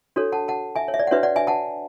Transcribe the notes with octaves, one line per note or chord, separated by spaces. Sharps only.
D4 F#4 A4 C#5
F#5 A5
F#5 A5
E5 G#5
C#5
E5
D5
F#5
D4 F#4 B4 C#5 E5
D5 F#5
E5 G#5
F#5 A5